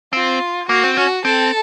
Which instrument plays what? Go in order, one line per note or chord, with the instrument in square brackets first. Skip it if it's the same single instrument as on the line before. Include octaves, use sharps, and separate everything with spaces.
[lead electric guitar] C4 [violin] F4
[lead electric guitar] A#3 [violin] F#4
[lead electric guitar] C4
[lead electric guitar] C#4 [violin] F#4
[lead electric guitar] C4 [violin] A4